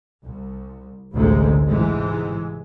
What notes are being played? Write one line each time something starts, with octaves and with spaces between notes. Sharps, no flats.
C2
A1 D2 C3 G#3
G#2 C3 E3 G#3